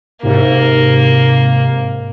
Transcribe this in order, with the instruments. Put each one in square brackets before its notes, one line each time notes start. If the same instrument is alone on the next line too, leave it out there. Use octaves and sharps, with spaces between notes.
[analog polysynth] G#2 C3 [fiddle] A#3